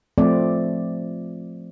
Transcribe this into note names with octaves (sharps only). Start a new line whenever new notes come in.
F3 A3 C4 D5